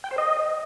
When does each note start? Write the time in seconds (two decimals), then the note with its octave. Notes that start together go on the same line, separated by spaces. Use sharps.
0.04 G5
0.11 C5
0.18 D#5